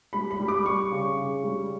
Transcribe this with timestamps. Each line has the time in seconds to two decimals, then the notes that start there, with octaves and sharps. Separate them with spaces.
0.13 G3 B5
0.31 B5
0.40 G3
0.48 D6
0.65 G3 C#6
0.91 C#3
1.16 C#3
1.44 G3